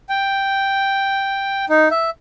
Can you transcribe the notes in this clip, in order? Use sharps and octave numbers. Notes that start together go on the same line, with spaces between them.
G5
D#4
E5